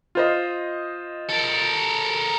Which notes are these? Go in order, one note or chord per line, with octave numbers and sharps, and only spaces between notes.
F4 C5 D#5
A4 A#4